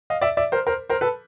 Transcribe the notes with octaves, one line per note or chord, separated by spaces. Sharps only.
D#5 F5
D5 E5
D5 E5
A#4 C5
A#4 C5
A#4 C5
A4 B4